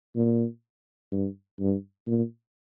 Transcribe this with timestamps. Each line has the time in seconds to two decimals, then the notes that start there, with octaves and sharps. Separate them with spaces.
0.16 A#2
1.12 G2
1.60 G2
2.07 A#2